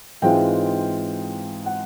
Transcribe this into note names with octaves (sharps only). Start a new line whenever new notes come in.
G#2 E3 G#3 C4 F4 G5
F#5